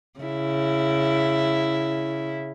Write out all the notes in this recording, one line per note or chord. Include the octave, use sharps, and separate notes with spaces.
C#3 E4